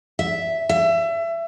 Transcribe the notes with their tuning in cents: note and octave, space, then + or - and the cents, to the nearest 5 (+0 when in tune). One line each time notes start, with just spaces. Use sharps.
E5 +0
E5 +25